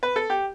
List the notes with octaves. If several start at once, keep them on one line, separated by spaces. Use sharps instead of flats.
B4
A4
G4